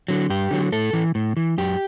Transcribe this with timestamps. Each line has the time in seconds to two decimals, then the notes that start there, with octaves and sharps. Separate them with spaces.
0.08 D3 F#3
0.30 G2 G4
0.51 D3 F#3
0.72 A2 A4
0.93 E3
1.15 A2
1.37 E3
1.58 F#2 G4